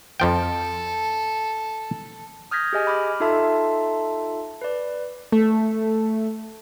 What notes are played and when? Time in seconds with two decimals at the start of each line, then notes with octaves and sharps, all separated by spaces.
0.20 F2 F3 A4 G5
2.51 D#6 F6 G6 G#6 A#6 B6
2.73 G4 G#4 D#5 G#5
2.87 B5 D6 F6
3.20 D#4 F4 A4 E5 A5 C6
4.62 B4 D5
5.32 A3